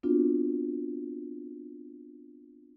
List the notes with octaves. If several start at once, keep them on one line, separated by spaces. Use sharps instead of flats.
B3 C4 D4 F4 F#4